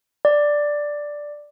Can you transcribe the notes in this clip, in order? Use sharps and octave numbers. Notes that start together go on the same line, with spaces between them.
D5